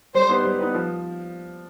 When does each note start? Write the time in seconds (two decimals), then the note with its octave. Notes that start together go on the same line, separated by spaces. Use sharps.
0.15 G3 C5
0.29 B3 D#4 G4 B4
0.44 G3
0.59 B3 D#4 G4 B4
0.74 F3